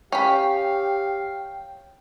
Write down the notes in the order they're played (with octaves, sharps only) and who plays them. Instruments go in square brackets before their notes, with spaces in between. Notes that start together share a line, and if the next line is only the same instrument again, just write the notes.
[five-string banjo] C#4 B5 [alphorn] G4 [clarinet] F5 [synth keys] G5